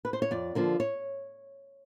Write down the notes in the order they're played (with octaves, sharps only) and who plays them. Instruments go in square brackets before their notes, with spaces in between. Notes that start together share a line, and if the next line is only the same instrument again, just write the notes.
[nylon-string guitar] B4
C5
C#5
F2 D5
D3 F3 A#3
C#5